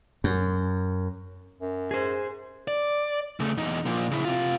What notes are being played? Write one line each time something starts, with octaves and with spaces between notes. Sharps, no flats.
F#2
F#2
G#4 C5
D5
C#3 A3
E2 D#4
A#2 F3
C#3 E4
C3 F4